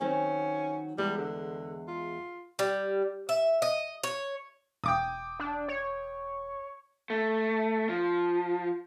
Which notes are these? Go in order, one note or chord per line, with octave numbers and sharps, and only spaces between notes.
D#3 F#3 C4 C#4
E2 G3 G#3
D3
F4
G3
E5
D#5
C#5
E1 G5 D6 D#6
D4
C#5
A3
F3